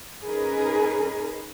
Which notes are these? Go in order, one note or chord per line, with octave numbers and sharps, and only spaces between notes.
C#4 D#4 G#4 A#4 B4